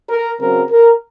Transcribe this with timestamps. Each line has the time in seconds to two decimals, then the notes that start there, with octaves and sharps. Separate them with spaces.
0.09 A#4
0.40 C#3 F#3 C4 A#4
0.70 A#4